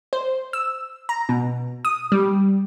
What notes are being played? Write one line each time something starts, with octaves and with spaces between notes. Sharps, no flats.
C5
E6
A#5
B2
D#6
G3